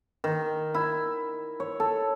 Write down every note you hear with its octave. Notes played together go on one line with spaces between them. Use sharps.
D#3
E4
C#5
A4